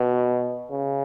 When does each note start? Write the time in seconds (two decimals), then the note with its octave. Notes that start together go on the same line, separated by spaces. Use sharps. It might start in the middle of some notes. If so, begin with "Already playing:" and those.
Already playing: B2
0.71 C#3